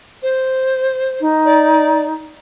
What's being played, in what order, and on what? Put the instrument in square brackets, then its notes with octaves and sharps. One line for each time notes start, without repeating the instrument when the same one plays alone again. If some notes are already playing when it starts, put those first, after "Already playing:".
[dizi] C5
[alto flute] D#4
[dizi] D5